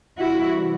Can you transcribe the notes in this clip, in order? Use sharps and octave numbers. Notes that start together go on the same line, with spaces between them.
C3 E3 G3 E4 F#4